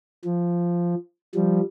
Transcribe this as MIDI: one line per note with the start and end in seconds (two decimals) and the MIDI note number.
0.25 0.95 53
1.35 1.61 53
1.35 1.61 55